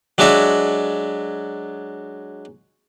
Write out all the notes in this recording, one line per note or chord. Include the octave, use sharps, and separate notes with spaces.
F#3 G#3 D4 F#4 E5